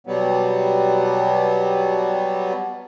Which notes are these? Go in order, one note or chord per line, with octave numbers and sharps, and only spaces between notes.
B2 F#3 G3 B3